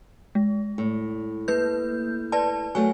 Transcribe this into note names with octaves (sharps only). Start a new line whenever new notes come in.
G#3
A2
A#3 B4 G6
B4 D5 A5
F#3 A3 A#4 G#5